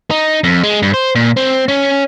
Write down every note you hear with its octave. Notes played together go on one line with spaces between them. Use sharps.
D#4
F2
G#3
G2
C5
A#2
C4
C#4